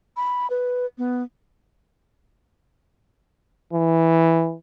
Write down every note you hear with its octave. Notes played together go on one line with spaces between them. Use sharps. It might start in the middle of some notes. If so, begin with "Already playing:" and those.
B5
B4
B3
E3